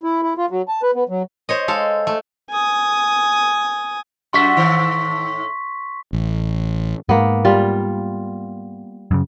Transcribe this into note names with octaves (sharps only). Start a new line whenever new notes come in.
E4
E4
F4
F#3
A5
B4
B3
F#3
C5 C#5 D#5
G#3 A4 F5
A3
G#5 D#6
F#2 F#4 E5 C6 C#6 B6
A2 D#3
A1
G#2 A#3 B3
G3 F4
F#2 C#3